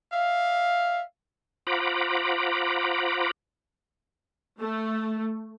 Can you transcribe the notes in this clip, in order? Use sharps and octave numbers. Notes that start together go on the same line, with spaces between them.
D5 E5 F5
F4 C5 F#5 A#5 B5 D6
A3